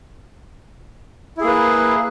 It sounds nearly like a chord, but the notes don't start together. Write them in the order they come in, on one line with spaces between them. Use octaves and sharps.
E4 G#4 A#3 B4